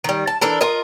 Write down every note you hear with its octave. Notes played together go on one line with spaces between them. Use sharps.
D#3 G3
A5
E3 D4 A4 A#4
F4 A#4 D#5